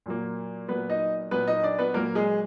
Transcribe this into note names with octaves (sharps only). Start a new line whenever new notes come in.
A#2 F#3 A#3
A#2 F#3 A#3 B3 B4
D#4 D#5
A#2 F#3 A#3 B3 B4
D#4 D#5
D4 D5
B3 B4
A#2 F#3 A#3 A#4
G#3 G#4